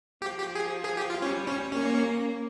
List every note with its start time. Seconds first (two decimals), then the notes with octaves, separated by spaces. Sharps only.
0.22 F3 G4
0.38 G4
0.55 G#4
0.85 G#4
0.97 G4
1.10 F4
1.22 G3 C#4
1.48 C#4
1.72 A#3 C#4